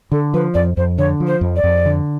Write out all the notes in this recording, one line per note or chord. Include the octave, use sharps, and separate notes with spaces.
D3 A4
F3 B4
F2 D5
F2 C5
D3 C#5
F3
C5
F2
D5
F2
D3